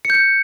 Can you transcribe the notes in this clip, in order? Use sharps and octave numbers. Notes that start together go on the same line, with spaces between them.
C#7
G6
C#7